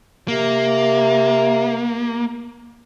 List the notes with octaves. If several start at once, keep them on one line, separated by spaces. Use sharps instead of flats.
C3 A#3